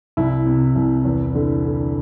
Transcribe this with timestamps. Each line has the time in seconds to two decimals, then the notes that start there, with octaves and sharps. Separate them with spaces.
0.17 C2 E4
0.46 C3
0.75 C2
1.05 E2
1.35 D3
1.64 D3